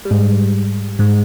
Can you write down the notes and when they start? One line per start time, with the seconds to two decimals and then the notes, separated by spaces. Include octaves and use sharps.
0.05 G3
0.11 G#2 G#3
0.99 G#2 G#3